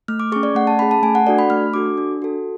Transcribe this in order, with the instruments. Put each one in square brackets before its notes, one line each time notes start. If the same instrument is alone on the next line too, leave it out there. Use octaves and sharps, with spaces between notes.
[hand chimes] A3 F6
D6
G#4 C#6
C#4
D5
A3 F#5
A5
C#4 G#4 B5
A5
A3 G#5
F#5
D4 F#4 A4 D5
B5
A3 F6
D4 F#4 A4 D6
D4
F#4 A4